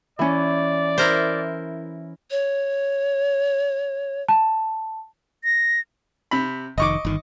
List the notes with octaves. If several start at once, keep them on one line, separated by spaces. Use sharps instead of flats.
E3 C#4 D5
E4 A#4 C5
C#5
A5
A#6
C3 B5
F1 D#3 D#5 C#6 D6
G1 D#3